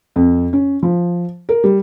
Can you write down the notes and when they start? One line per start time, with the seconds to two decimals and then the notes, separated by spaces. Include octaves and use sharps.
0.16 F2
0.53 C#4
0.83 F3
1.49 A#4
1.64 G3